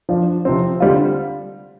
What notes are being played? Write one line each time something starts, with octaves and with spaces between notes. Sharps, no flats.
F3 D4 F4
C3 F3 C4
D3 G3 C4 F4